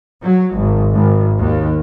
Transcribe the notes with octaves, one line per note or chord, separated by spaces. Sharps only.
F#3
G#1
G#1
D#2